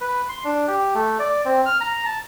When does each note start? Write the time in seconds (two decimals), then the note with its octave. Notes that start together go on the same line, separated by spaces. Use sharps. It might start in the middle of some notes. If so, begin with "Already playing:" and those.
0.01 B4
0.29 C6
0.45 D4
0.68 G4
0.95 A3
1.19 D5
1.45 C4
1.66 F6
1.81 A#5
2.06 A5